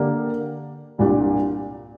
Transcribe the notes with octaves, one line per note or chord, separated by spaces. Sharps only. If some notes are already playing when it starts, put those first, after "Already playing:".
Already playing: D3 A#3 D4 G4
C2 A#2 G3 D4 G4